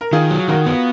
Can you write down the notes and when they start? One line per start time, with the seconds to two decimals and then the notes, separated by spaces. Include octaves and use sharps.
0.01 A#4
0.13 D#3 F4 G#4
0.31 F#3
0.48 D#3 F#4 A#4
0.66 B3